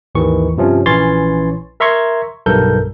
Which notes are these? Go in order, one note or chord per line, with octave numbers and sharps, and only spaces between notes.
G#1 D#2 D#3 E3 C#6
G2 C3 F3 C#4
A#1 E3 C#4 C#5 C6 A6
A#4 E5 A#5 C6 C#6 G#6
B1 G2 A4 A#4 G6